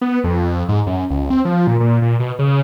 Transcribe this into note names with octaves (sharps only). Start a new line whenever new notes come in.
B3
F2
G#2
F#2
C#2
C4
F3
A#2
A#2
A#2
B2
C#3